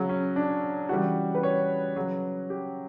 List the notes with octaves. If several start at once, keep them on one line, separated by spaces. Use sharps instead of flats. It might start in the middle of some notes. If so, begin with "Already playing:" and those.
Already playing: C#3 F#3
C#4
D4
C#3 E3 G3 F#4
B4
C#5
C#3 F#3
G4